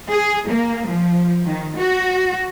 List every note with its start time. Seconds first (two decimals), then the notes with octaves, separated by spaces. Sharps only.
0.13 G#4
0.50 A#3
0.88 F3
1.45 D#3
1.77 F#4